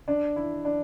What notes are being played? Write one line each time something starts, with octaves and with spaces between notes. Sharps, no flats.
D4
E4
D4